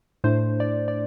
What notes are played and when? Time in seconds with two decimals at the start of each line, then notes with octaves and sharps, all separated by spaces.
0.24 A2 A3 D4 C5
0.60 D5
0.88 D5